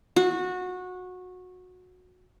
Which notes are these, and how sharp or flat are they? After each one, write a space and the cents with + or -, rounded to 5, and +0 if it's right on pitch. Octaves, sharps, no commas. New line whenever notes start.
F#4 -20